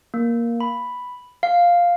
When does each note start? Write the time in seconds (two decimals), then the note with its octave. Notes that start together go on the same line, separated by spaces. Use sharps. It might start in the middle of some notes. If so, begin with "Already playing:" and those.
0.14 A#3
0.61 B5
1.43 F5